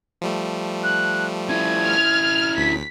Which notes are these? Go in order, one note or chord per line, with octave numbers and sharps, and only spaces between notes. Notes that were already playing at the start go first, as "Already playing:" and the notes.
F3 G3 A3
F#6
C#4 E4 G#6
F6
D2 B6